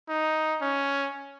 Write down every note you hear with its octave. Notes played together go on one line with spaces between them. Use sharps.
D#4
C#4